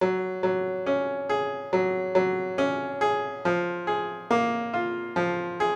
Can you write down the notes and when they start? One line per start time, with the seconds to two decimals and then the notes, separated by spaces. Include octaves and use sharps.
0.01 F#3
0.43 F#3
0.86 C#4
1.29 G#4
1.73 F#3
2.15 F#3
2.58 C#4
3.01 G#4
3.45 F3
3.87 G#4
4.31 A#3
4.74 F4
5.16 F3
5.60 G#4